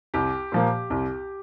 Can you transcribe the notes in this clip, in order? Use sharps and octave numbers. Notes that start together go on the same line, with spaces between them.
C2 G4
A#2 F3 A#3
C2